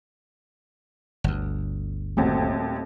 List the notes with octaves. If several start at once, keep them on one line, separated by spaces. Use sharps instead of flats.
G1 D2
D#1 D#2 A3 C4 F#4